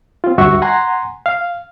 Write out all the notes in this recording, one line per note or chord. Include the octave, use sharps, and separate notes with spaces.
C4 F4
D2 G2 F#4 E5 C#6
F#5 G#5 A#5 C6
F5